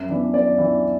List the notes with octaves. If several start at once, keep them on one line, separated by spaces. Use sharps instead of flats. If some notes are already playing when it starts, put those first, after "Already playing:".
Already playing: F#2 E5
E3 B3 D4
F#2 D5
E3 B3 D4